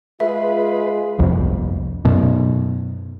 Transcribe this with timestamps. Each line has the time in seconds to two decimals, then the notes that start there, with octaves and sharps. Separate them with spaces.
0.20 G#3 F4 G#4 B4 E5
1.18 G1 C2 F2
2.05 F#2 B2